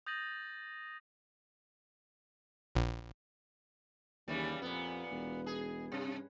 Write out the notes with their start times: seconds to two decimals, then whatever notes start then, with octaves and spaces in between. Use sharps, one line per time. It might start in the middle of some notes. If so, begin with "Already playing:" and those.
0.06 D#6 G6 A6 A#6 D#7 F#7
2.75 A#1
4.28 D#2 C#3 E3 G3
4.62 F2 A#2 B3
5.11 E1
5.46 D#4 G#4
5.92 G2 C3